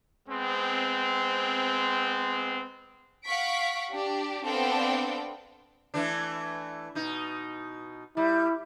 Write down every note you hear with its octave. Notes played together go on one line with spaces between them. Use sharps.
G#3 B3 C4
F5 F#5 C#6 B6 D7
D4 G4
B3 C4 D4 A4 F5 G5
E3 A3 D4
B2 D#4
G3 E4